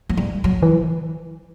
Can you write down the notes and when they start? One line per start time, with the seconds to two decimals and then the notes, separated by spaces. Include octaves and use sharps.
0.09 F#3
0.17 G3
0.44 F#3
0.63 E3